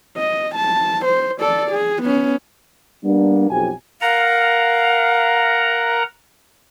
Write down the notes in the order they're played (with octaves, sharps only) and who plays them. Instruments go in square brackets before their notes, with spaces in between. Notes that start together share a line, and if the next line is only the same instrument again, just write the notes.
[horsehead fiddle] D#5
A5
C5
A4 D5
G#4
B3 C#4
[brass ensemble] G3 A#3 B3 D4
B1 F2 G4 G#5
[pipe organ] A#4 F#5 A#5 [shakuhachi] F5